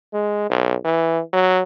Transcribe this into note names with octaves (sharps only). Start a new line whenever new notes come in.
G#3
B1
E3
F#3